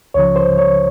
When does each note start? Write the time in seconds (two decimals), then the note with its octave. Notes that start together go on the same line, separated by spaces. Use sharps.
0.14 C#2 C#3 F3 C#5
0.36 C5
0.58 C#5